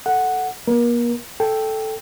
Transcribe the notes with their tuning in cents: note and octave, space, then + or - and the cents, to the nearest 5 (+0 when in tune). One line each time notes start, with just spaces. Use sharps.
A4 +0 F#5 +0
A#3 +40 A#4 +35
A4 -5 G5 +0